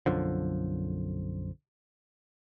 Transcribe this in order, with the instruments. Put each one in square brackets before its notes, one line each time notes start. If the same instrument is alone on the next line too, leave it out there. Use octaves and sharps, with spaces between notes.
[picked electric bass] B1 F#2 D3 F3